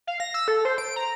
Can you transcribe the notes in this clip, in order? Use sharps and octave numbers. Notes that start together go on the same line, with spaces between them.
F5
A#6
E6
A4
C5
D7
A#5